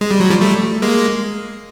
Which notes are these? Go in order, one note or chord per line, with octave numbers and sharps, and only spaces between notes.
G#3
G3
F#3
F3 G3
G3 A3
G#3 A#3